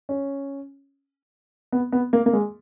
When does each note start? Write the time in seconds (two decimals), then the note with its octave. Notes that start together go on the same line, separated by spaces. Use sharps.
0.09 C#4
1.72 B3
1.92 B3
2.13 A#3
2.26 A#3
2.33 G#3